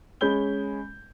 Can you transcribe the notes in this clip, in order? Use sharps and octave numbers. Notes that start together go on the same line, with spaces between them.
G#3 C#4 B5 G6 G7